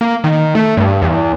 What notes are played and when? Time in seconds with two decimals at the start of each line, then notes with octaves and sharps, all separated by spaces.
0.01 A#3
0.24 D#3
0.55 A3
0.77 G2
1.02 E2